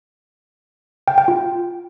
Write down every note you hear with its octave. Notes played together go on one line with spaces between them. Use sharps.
G5
G5
F4